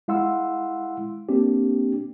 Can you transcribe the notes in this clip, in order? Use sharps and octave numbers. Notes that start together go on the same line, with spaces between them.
G#3 E4 F5 F#5 C6 E6
A#3 C4 D4 G4